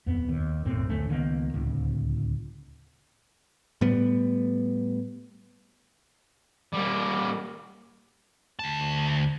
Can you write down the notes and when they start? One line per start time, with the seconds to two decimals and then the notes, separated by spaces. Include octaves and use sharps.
0.06 D#1 F2 B3
0.29 D#2
0.65 B1 F#2 A2 C4
0.89 D1 D2 A3 C#4
1.09 C#2 D#3 A#3 B3
1.54 D1 C#2
3.81 A2 G3 B3
6.73 G3 A#3
8.59 D2 A5